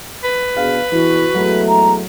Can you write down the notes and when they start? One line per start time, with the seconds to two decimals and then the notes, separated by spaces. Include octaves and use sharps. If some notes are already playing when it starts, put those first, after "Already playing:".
0.24 B4
0.56 B2 D4 G#4 F5
0.92 E2 E3 F#4
1.35 E2 F#3 G#3 A3
1.68 A#5